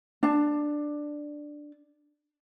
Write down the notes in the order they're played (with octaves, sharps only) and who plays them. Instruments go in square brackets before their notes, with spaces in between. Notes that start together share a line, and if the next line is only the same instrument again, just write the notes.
[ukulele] D4 A5